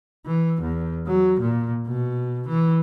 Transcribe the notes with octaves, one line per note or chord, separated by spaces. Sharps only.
E3
E2
F#3
A#2
B2
E3